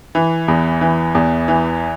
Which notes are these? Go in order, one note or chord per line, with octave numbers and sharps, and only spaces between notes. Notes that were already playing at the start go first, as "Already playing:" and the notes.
E3
E2
E3
E2
E3